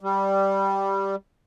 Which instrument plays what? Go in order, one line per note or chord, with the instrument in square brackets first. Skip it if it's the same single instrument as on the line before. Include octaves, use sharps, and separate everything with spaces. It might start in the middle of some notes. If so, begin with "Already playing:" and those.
[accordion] G3